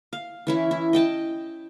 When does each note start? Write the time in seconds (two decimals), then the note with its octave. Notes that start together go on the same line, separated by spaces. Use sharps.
0.13 F5
0.47 E3 C#4 E4
0.71 E4
0.93 D#5 G5 A5